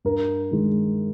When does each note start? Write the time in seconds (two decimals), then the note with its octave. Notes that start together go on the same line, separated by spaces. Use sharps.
0.05 G2 A#4
0.51 D#3 G#3